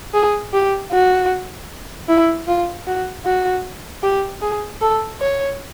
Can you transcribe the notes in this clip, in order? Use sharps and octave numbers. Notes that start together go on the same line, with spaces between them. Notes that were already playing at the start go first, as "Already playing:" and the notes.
G#4
G4
F#4
E4
F4
F#4
F#4
G4
G#4
A4
C#5